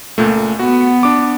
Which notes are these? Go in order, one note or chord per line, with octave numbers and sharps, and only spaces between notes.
C#2 A#2 A3
B3 F#4
D4 D6